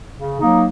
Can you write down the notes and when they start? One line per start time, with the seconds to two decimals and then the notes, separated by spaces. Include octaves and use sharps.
0.15 C#3
0.40 F#3 A#3 D#4